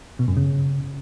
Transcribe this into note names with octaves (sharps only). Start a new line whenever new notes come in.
B2
F#2
C#3